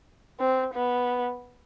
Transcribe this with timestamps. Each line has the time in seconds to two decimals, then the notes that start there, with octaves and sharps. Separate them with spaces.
0.40 C4
0.74 B3